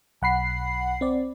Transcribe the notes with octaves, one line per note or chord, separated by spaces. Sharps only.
B1 F#5 B5 C7
C4 D5